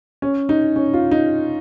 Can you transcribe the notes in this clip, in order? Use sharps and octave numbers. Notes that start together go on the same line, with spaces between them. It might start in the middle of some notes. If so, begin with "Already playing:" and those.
C#4
D#4
C#4
F4
D#4